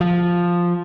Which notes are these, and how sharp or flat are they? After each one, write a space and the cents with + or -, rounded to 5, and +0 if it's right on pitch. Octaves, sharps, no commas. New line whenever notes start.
F3 +0